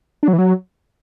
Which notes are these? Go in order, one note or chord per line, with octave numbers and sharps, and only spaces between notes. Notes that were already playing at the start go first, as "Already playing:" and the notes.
D4
F#3
E3
F#3